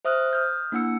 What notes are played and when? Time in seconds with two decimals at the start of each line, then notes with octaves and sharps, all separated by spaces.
0.05 C5 E5 D#6 F6 F#6
0.33 D#6 F6 G6
0.72 A#3 D4 E4 F#5 E6 C#7